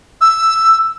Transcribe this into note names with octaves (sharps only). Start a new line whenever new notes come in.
E6